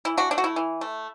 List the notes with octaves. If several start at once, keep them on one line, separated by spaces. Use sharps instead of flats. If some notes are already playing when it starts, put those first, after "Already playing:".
E3 E4
D4 F#4
A3 D4
F#4
E4
E3
A3